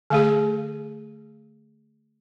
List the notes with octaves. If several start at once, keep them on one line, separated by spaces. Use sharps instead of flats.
D3 A3 G#4